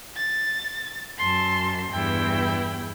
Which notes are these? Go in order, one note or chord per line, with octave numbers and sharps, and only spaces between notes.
A6
F#2 A5 C6
E2 G2 E4 G5